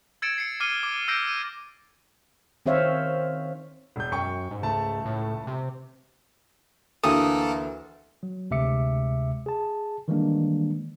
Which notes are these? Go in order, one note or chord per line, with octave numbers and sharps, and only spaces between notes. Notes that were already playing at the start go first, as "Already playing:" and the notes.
E6 G#6 A6 C#7 D7 E7
C7 C#7
D6 F6 C7 C#7 D#7 G7
D6
E6 G6 A#6 C7 D7
D#7
D#3 C4 C5 C#5 E5 F5
E1 G6
F#2 G5 C#6 C#7
G#2
C#2 A3 A5
A2
C3
D2 E3 A#3 A4 D#6
F#3
D2 C3 G#3 E5 D6 C#7
G#4 A5
D#3 E3 G3 G#3 A#3 D4